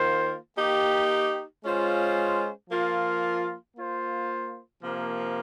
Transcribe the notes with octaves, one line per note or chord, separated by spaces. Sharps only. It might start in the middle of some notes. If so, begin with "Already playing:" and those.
Already playing: D#3 A#3 F4 C5
A#3 D#4 G4
G#3 C#4 F4 C5
F3 A#3 F4
A#3 F4 C5
C3 F3 A#3